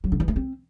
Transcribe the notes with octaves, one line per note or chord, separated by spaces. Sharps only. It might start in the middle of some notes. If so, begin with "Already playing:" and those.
F#3
D3
E3
A3
C4